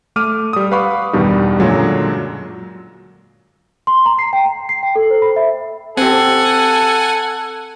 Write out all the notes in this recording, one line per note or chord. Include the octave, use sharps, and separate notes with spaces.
A3 D6 F6 D#7
G3 D#6
B4 F5 F#5 B5 C#6 D6
E2 G2 B2 D#3 G3
F#2 A#2 D3 F#3 G#3
C6
A#5
C7
G5
A#5
C7
G5
A4
C5
B5
E5
C4 G4 A4 F#5 G#5